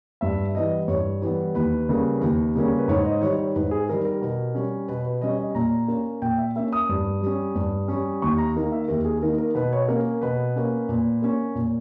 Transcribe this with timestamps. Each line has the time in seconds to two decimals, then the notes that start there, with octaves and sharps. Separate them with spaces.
0.21 G2 E5
0.55 E3 G3 B3 D#5
0.88 G2 C#5
1.22 E3 G3 B3
1.55 D#2 B4
1.89 C#3 G3 A#3 C#4
2.21 D#2
2.55 C#3 G3 A#3 C#4
2.78 B4
2.88 G#2 C#5
3.06 D#5
3.21 D#3 G3 C#5
3.39 C#5
3.55 G#2 B4
3.71 G#4
3.89 D#3 G3 A#4
4.05 A#4
4.22 B2
4.55 G3 C#4
4.88 B2 B4
5.06 B4
5.21 G3 C#4 D#5
5.38 D#5
5.55 A#2 A#5
5.88 A#3 C#4
6.22 A#2 G5
6.38 E5
6.56 A#3 C#4 E5
6.73 D#6
6.89 G2
7.21 G3
7.27 C#4
7.55 G2
7.88 G3 C#4
8.22 D#2 C#6
8.38 A#5
8.55 D#3 A#3
8.72 E5
8.88 D#2 A#4
9.05 G#4
9.22 D#3 A#3 A#4
9.38 A#4
9.55 B2 B4
9.73 C#5
9.88 A#3 C#4 A#4
10.21 B2 B4
10.56 A#3 C#4
10.89 A#2
11.22 A#3 C#4
11.55 A#2